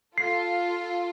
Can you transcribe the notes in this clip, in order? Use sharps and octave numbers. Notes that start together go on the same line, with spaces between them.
F4 A4 C7